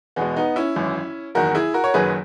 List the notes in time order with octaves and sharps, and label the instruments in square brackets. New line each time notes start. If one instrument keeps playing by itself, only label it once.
[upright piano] E2 B2 G#3 B3
B3 D#4
C#4 E4
G#1 F#2 E3
F#1 E2 D#3 F#4 A#4
E4 G#4
F#4 A#4
C#5
F#1 F#2 D#3 F#3 G#4 B4